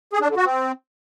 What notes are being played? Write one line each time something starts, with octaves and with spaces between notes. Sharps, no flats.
G#4
D4
D3
F#4
C4